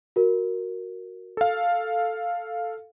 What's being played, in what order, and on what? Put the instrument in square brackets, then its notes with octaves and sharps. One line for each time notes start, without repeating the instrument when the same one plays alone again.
[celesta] F#4 A#4
[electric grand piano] A4 F5